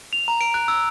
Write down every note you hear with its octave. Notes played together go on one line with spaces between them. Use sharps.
F7
A#5
D7
F#6
E6